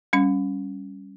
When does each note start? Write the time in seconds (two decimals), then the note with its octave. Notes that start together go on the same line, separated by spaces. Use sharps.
0.13 G3 C#4